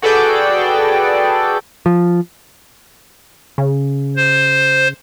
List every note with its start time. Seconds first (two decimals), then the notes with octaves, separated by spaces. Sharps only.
0.02 F#4 G#4 A4 B4 D5 G5
1.86 F3
3.58 C#3
4.16 C5